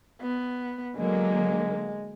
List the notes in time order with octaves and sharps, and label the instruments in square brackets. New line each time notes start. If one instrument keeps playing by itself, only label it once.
[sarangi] B3
[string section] D3 F#3 A#3 [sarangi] G#3